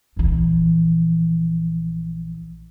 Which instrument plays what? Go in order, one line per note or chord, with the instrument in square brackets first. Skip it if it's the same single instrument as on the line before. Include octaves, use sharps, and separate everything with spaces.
[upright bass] A#1 E3